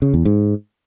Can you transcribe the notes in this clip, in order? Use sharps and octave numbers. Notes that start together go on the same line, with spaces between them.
C#3
E2
G#2